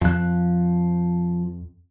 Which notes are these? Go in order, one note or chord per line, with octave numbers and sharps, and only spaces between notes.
F2 F3 F#6